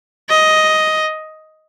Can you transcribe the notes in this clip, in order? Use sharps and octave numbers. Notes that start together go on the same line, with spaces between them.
D#5